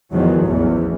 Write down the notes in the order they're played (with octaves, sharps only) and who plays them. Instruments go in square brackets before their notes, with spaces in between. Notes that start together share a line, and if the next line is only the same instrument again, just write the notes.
[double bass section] E2 D#3 F3 F#3 G#3
A1 E2